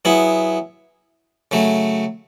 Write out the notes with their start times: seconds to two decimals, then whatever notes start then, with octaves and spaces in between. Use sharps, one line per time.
0.05 F#3 B3 E4 G#4
1.51 C#3 F#3 A3